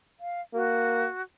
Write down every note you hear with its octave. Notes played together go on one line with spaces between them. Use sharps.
F5
A#3 F#4